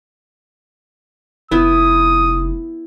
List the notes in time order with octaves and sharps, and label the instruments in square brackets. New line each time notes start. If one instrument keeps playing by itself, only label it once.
[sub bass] F1 [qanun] B3 E4 [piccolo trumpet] D#6